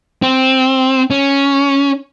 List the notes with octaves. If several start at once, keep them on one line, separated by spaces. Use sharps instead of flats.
C4
C#4